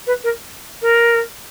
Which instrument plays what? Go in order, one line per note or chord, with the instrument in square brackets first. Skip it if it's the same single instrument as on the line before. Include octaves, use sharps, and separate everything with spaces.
[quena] B4
A#4
A#4